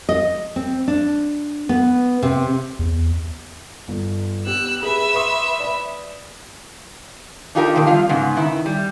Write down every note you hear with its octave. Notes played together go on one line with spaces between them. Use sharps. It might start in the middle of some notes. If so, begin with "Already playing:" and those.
D#5
C4
D4
B3
C3
E2
G1
B3 G4 E6 F#6
G#4 B4 E5
C6 C#6 D#6
D5 B5
D4 D#4 F4 G4 A4 A#4
A#2 D#3 B4 G5
F2 G3 F4 F5
G#2 C#3 B3
D#3 E4
G3